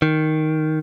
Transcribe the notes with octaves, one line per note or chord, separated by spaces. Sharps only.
D#3